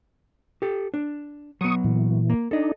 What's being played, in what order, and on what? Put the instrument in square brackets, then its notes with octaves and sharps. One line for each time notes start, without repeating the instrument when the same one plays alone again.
[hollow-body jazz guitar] G4 A4
D4
[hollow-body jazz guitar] F#3 B3 [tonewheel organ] C#6 D#6
[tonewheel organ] A#2 E3
[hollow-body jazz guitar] A#3
[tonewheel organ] D4 D#4 [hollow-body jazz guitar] A4 D#5